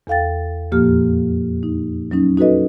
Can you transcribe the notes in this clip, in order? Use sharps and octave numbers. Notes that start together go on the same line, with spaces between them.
E2 A4 F5 G5 A6
F2 A#2 F3 A#3 G4 F6
D#4
F#3 C#4 D#4
D#4 F#4 A4 B4 D#5